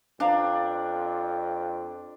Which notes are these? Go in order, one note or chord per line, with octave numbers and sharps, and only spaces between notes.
F2 D4 C5 F5 A#5